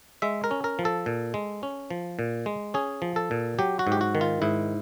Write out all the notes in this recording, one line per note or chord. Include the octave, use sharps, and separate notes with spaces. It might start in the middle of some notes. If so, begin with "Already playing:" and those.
G#3 E5
A#4
C#4
A#4
F3
A4
A#2
G#3
C#4
F3
A#2
G#3
C#4 G#4
F3
A4
A#2
F#3 G4
F#4
G#2
G4
F#4
D#3
F4
G#2 E4